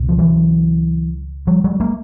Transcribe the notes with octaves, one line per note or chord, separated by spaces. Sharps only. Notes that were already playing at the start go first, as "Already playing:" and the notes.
Already playing: C#2 B2
F3
E3 F#3
F3 G3
F#3 G#3
G#3 A#3